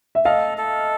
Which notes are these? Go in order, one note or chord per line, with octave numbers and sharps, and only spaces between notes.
E5
A4 D#5 F5
A4